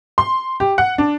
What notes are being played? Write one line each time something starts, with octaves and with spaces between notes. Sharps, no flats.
C6
G4
F#5
D4